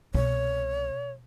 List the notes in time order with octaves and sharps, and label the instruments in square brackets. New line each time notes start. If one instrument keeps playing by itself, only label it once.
[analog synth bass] C2 [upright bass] B2 [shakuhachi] C#5